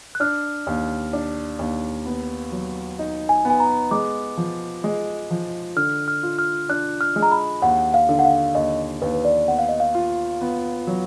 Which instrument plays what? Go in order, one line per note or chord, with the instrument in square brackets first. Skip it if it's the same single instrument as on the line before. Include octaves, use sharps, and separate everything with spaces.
[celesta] F#6
[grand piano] D4 [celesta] F6
[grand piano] D#2
D4
D#2
B3
F#3
D#4
[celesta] G#5
[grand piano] B3 [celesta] G#5
[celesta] A#5
[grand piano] G#3 [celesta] D6
[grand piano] F3
G#3
F3
[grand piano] D3 [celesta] F6
[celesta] F6
[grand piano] F4
[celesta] F6
[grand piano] D4 [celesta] F#6
[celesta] F6
[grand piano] G#3
[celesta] A#5
B5
[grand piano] D#2 [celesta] F#5
[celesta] F5
[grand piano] D3
[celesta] F#5
F5
[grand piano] D#2 [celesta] D#5
[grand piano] D#2 [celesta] B4
[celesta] B4
D5
[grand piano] B3 [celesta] F#5
[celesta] F5
D#5
F5
[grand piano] F4
B3
F#3